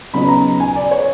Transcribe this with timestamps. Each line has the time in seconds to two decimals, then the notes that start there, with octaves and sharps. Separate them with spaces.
0.14 C#3 F#3 B3 D#4 B5
0.28 A#5
0.60 G#5
0.76 D5
0.91 C#5